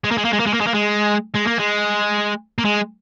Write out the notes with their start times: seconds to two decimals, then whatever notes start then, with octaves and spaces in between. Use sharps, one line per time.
0.04 G#3
0.11 A#3
0.18 G#3
0.25 A#3
0.33 G#3
0.40 A#3
0.47 G#3
0.54 A#3
0.61 G#3
0.67 A#3
0.75 G#3
1.35 G#3
1.48 A#3
1.60 G#3
2.59 A#3
2.65 G#3